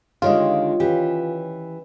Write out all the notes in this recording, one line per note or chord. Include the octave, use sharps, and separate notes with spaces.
D3 D#3 G#3 F4 G4 C#5 D#5
D#3 E3 C#4 G4